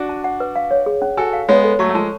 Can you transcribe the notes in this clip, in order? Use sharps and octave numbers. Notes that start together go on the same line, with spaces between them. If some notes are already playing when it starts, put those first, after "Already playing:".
Already playing: D4 F#4
A5
F#5
B4
F5
C#5
G#4
C#4
F#4 A4 G#5
F5
G#3 B3 C#5
A4
F#3 A3 C#6
A3
F3 G#3 A5